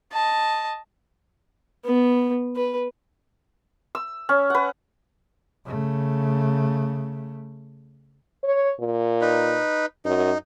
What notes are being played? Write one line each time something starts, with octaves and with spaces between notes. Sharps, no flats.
D#5 A5
B3
B4
E6
C#4
B4 F#5
C#3 A3
C#5
A#2
D#4 B4
F#2 D#4